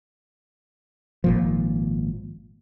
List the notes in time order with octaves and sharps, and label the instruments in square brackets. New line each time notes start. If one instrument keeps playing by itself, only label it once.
[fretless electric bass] G#1 A#2 F3